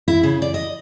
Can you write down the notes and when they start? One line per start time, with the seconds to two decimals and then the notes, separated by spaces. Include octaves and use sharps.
0.08 E4
0.23 C#3
0.42 D5
0.54 D#5